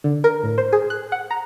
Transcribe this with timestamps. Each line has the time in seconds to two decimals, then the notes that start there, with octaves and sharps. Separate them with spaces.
0.04 D3
0.24 A#4
0.43 A2
0.58 C5
0.73 G#4
0.90 F#6
1.12 F#5
1.31 A#5